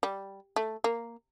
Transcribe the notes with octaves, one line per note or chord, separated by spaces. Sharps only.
G3
A3
A#3